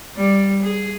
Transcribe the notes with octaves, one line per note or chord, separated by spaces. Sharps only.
G3 D5
G#4